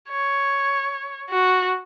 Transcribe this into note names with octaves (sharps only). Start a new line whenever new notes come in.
C#5
F#4